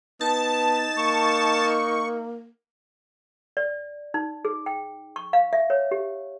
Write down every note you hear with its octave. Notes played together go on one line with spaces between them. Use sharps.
B3 D#4 A5
A#3 C#6
D5
D#4
G#4
G5
C#6
F5
E5
C#5
G4